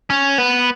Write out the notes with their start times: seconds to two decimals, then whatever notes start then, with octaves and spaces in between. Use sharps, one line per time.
0.10 C#4
0.38 B3